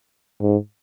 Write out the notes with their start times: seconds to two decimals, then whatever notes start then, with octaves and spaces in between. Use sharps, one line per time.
0.41 G#2